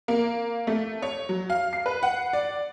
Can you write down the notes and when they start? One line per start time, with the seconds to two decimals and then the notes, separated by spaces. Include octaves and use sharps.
0.08 A#3
0.67 A3
1.02 C#5
1.29 F#3
1.50 F5
1.73 C7
1.86 B4
2.03 F#5
2.33 D5